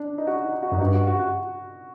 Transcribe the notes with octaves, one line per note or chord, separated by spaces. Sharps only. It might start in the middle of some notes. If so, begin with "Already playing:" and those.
Already playing: D4
D#4
F#4
D#4
F#4
F#2 D#4
G2 F#4
F#4
F#4
F#4